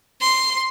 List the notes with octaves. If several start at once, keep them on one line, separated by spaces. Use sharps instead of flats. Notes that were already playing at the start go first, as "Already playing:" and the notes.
C6